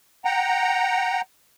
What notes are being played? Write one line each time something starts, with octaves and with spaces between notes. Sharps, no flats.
F#5 G5 A#5